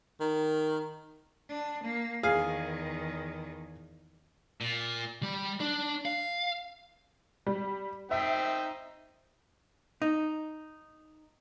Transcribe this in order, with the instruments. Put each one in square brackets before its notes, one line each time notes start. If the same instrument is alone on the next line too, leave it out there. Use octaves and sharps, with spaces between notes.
[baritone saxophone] D#3
[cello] D4
A#3
[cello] E2 D#3 [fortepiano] G#4 F5
[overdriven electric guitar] A#2
[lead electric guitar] G3
D4
F5
[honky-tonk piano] G3
[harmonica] C4 D#4 G5 [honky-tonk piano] E5
[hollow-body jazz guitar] D#4